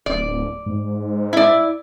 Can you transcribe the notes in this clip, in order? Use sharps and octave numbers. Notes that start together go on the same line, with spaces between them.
D1 D5
G#2
E4 D5